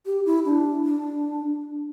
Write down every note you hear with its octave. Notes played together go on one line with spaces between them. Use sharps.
G4
E4
D4
D4